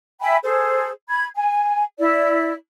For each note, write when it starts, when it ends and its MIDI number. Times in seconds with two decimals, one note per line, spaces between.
0.21 0.37 76
0.21 0.37 79
0.21 0.37 80
0.21 0.37 83
0.42 0.89 68
0.42 0.89 69
0.42 0.89 72
1.09 1.25 83
1.09 1.25 92
1.35 1.82 80
1.98 2.53 64
1.98 2.53 74